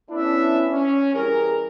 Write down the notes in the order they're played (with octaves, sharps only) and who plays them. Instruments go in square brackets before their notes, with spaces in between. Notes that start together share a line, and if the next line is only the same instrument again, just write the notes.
[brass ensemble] B3 C#4 D4 E4 A4 E5
C#4
E3 G3 G#4 A#4